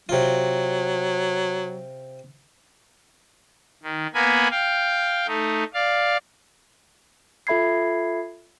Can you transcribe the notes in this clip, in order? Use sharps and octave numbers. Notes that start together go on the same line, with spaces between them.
C3 F#3 F4
D#3
A#3 B3 A#4 G#5 B5
F5 G5
A3 D#4
D5 F5
F4 A4 E5 B5 G#6 C7